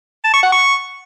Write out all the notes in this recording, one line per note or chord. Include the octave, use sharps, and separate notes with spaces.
A5
C#6
F#5
C#6